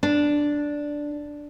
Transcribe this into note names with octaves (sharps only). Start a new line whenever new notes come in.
D4